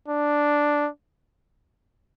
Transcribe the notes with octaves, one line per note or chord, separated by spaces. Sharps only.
D4